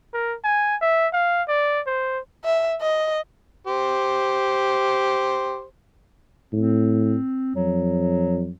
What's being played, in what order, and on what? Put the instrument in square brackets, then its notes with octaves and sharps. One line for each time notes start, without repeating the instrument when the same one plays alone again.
[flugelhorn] A#4
G#5
E5
F5
D5
C5
[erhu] E5
D#5
[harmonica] G4 C5
[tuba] A2 [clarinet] C4
[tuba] F2 [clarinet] F#3